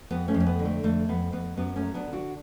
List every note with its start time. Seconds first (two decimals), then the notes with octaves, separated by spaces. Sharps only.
0.11 F2 B3
0.28 A3 C#4
0.34 F2
0.40 C#4
0.46 B3
0.59 D3
0.65 A3
0.84 F2 A3
1.09 F2 B3
1.32 F2 B3
1.57 F#2 B3
1.75 A3 C#4
1.82 F#3
1.94 B3 D4
2.07 D3
2.13 D4 F#4